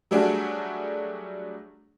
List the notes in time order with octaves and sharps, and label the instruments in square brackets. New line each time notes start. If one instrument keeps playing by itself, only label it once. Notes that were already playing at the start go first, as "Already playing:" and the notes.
[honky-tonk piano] F#3 G3 A3 D4 F#4 G#4